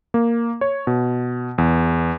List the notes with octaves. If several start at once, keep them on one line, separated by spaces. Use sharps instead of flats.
A#3
C#5
B2
E2